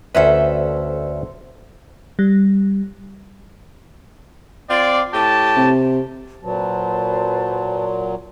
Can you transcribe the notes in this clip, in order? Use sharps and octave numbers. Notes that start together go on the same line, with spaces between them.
D2 C#4 A4 B4 C5 E5
G3
C4 F4 D5
A2 G4 A5
C3
A#2 F#3 B4 C5 A5